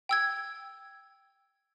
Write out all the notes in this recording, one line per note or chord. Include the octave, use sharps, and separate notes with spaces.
G5 E6 G#6